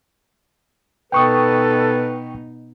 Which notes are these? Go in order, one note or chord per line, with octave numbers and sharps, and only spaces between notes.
B2 D#4 A4 B4 G5 C#6 D#6